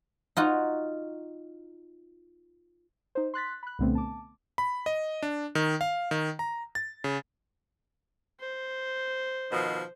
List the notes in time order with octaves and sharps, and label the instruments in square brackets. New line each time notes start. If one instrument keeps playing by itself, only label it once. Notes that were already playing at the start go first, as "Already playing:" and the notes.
[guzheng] D#4 F4 F#4
[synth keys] D#4 C5
C6 F#6 A6 B6
B5 F#6
C2 A#2 D3 A3 B3 C4
A5 D6
[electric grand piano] B5
D#5
D4
D#3
F5
D#3
A#5
A6
C#3
[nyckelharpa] C5
[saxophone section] B2 D#3 F3